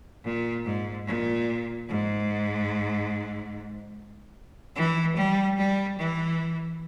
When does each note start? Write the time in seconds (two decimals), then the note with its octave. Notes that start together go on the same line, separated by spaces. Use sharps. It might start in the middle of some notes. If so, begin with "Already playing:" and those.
0.24 A#2
0.65 G#2
1.06 A#2
1.88 G#2
4.76 E3
5.16 G3
5.57 G3
5.98 E3